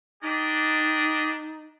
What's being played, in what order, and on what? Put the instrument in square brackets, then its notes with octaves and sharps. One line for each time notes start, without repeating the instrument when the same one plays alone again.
[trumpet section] D4 G4 D#5 [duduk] D#4